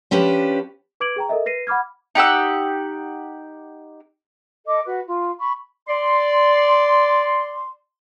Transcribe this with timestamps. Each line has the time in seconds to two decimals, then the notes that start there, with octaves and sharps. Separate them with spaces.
0.11 F3 C#4 D4 G4 B4
1.00 B4 D6 G#6 D7 F#7
1.16 G#4 G5 A#5
1.29 A4 A#4 D#5 E5
1.46 B4 A#6 C7 D#7
1.67 F#5 B5 D6 F6 G#6
2.15 D#4 G4 F#5 E6
4.66 A4 D#5 D6
4.85 F#4 B4
5.07 F4
5.37 B5 C#6
5.88 D5 C6